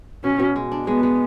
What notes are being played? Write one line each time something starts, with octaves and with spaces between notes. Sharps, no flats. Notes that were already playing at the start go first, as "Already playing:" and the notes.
B2 C#4
B2
G#3
D4
G#3 B3
G#3